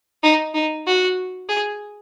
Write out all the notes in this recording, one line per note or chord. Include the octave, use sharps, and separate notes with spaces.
D#4
D#4
F#4
G#4